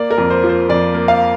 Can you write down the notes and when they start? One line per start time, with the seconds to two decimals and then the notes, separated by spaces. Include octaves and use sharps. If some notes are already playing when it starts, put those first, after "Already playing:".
Already playing: A#3 D5
0.11 A#4
0.18 F2
0.30 C5
0.44 F3
0.49 C5
0.69 F2 D5
0.95 A#3
1.08 F5